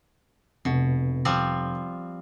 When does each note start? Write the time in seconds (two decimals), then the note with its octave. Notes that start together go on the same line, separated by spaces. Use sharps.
0.65 F1 B2
1.25 F3 G3 C4